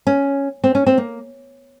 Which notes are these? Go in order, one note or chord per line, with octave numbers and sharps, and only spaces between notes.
C#4
C4
C#4
C4
A#3